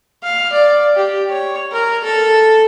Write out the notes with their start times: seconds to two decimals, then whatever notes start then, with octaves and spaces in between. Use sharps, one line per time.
0.23 F5
0.53 D5
0.96 G4
1.30 C#5
1.72 A#4
2.04 A4